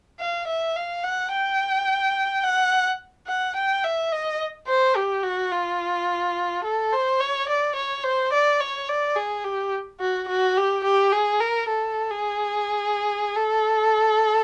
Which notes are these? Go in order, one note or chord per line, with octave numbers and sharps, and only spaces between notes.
F5
E5
F5
F#5
G5
F#5
F#5
G5
E5
D#5
C5
G4
F#4
F4
A4
C5
C#5
D5
C#5
C5
D5
C#5
D5
G#4
G4
F#4
F#4
G4
G4
G#4
A#4
A4
G#4
A4